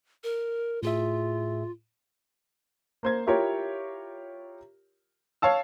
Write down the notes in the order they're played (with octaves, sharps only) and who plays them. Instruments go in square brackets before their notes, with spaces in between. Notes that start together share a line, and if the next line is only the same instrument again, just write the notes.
[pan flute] A#4
[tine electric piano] A2 G#4 E5 [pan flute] F4
[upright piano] A#3 C5 G#6
E4 F4 G4 A#4 C#5
C#5 F5 A5 E6